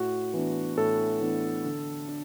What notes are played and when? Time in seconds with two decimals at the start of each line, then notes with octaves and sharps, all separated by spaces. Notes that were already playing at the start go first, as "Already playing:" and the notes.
Already playing: A2 F#4
0.34 E3 B3 D4
0.77 A2 A4
1.21 E3 B3 D4
1.65 D3
2.08 D4